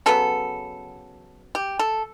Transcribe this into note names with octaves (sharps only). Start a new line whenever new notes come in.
C#3 F#3 B3 A4
G4
A4